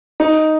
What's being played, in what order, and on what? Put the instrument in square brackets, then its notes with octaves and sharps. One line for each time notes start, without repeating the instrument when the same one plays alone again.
[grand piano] D#4